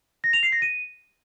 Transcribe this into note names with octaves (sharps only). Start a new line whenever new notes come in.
A#6
F7
C7
A#6
D#7